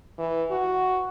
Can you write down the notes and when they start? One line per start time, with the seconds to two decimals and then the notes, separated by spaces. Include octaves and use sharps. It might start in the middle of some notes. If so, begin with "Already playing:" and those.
0.19 E3
0.51 F#4